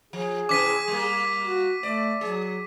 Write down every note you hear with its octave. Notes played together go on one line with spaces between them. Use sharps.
F3 G#4
C3 E3 C#4 D6 B6 D#7
G3 A#3
F#4
A3 D5
F#3 G#4